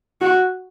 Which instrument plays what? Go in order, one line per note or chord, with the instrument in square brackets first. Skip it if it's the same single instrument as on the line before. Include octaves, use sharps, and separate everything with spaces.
[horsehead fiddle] F#4